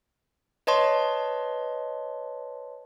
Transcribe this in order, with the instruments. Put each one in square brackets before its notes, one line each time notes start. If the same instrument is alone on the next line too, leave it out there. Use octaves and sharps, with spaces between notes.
[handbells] B4 C#5 D#5 A5 C6